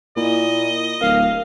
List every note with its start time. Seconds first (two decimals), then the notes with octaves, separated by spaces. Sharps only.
0.17 A#2 E4 D#5
1.01 D1 A#4 F5